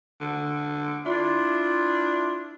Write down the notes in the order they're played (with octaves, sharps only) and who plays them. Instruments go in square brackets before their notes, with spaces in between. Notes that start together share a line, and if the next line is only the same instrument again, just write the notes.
[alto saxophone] D3
[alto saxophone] D4 [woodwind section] E4 F4